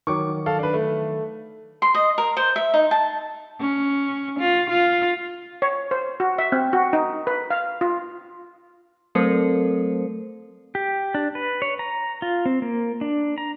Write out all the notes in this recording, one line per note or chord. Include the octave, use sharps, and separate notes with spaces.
D#3 F#3 C#6 D6
A4 F5
D4 B4
A3
C6
D#5
A#4
C5
E5
D#4
A5
C#4
F4
F4
C#5
C5
F#4
E5
C4
F#4
D#4
B4
F5
F4
F#3 A3 C4 A4 A#4 C5
G4
D4
B4
C#5
A#5
F4
C4
A#3
D4
A#5